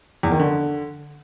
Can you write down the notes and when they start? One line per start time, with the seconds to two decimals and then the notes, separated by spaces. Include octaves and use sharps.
0.23 E2
0.31 D#3
0.40 D3